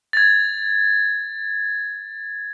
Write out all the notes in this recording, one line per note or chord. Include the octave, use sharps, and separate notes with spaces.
G#6 A6